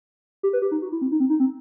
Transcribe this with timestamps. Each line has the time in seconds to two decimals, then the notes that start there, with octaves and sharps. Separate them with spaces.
0.43 G4
0.53 B4
0.62 G4
0.72 D#4
0.82 F#4
0.92 E4
1.01 C4
1.12 D#4
1.20 C4
1.30 D#4
1.40 C4